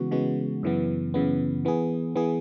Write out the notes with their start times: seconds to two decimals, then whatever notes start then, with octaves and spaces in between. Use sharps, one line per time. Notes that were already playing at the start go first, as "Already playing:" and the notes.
Already playing: C#3 E3 G#3 B3 F#4
0.11 C#3 E3 G#3 B3 F#4
0.63 F#2 C#3 E3 B3
1.14 F#2 C#3 E3 B3
1.65 E3 B3 G#4
2.16 E3 B3 G#4